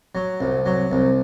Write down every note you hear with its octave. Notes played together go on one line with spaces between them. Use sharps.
F#3
C2
F#3
C2